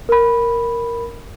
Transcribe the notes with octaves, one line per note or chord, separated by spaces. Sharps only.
A#4 B5